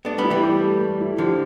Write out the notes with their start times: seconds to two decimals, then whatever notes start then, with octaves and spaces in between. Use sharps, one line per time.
0.05 A3 B3 D4
0.18 G3 B3
0.24 E4
0.30 E3 G3
0.43 G4
0.62 A3
0.81 A3
1.01 E4
1.18 D3 F3 G4